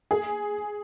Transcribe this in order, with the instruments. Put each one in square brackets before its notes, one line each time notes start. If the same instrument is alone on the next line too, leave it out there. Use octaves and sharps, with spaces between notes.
[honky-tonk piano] G#4